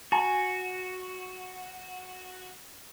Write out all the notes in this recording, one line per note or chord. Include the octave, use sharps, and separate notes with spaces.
F#4 G#5